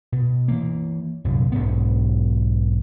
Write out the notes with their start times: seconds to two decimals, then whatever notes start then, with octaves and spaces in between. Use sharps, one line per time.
0.12 B2
0.48 E3 A#3
1.25 C2 F#2 A#2
1.52 B1 E2 G#2 B3